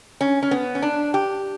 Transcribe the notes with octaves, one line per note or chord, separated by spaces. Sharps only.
C#4
C#4
B3
C#4
D4
G4